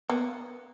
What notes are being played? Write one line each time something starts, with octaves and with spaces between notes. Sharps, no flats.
A#3 B3